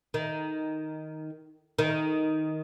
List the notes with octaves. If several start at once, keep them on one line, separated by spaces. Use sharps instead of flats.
D#3
D#3